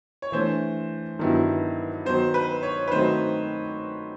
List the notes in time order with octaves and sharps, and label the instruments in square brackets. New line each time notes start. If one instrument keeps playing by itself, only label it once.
[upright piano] C#5
[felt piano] E3 A3 D4 [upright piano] C5
[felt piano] G2 D#3 F#3 B3 E4
[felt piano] D#3 F#3 B3 [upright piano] C5
[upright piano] B4
C#5
B4
[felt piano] D#3 F#3 A3 C4 D#4 [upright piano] C5